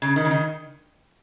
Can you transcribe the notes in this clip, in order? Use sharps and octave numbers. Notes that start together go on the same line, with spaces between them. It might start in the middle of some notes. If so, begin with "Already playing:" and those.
C#3
D#3
C#3
D#3